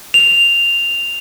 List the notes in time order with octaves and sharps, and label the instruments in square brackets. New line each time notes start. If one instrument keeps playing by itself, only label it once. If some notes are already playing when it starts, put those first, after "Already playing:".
[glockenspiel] F7